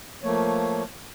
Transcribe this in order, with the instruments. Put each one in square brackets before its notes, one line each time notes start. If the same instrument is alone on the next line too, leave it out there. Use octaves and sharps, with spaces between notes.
[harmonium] F3 A3 A#3 C#5